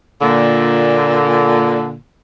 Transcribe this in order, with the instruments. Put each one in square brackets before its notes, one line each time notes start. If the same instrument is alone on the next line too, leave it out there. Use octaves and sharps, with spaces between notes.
[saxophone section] A#2 D3